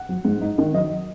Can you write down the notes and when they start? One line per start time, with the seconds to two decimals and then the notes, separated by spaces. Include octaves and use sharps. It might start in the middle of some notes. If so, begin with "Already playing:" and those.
Already playing: F#5
0.09 F#3
0.25 G#2
0.41 D#4
0.58 D#3
0.73 F#3 D#5